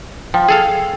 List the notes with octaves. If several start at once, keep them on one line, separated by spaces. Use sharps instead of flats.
F3 G5
G#4 A4 F5